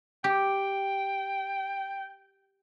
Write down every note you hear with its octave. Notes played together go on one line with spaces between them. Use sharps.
G4 G5